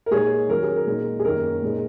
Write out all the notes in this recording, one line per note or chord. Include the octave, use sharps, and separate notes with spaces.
A#4
A#2 G#3 D#4 G#4 C#5
D#3 F#3 C#4 A#4
G#4
A#4
A#2 G#3 D#4
G#4
F#2 D#3 A#3 C#4 A#4
A#2 G#3 D#4